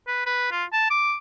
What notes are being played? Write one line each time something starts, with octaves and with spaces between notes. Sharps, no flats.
B4
B4
F4
A5
D6